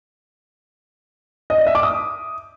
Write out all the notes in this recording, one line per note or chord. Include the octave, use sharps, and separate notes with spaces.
D#5
D5
E5
D6
D#6